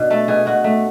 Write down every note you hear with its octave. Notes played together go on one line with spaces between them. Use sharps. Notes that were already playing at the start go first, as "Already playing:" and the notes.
Already playing: B2 D4
A3 A4
B2 G#4
B2 F#4
A3